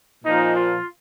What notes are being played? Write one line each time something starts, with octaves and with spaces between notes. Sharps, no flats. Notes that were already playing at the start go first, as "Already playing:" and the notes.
A#2 F3 D#4
F4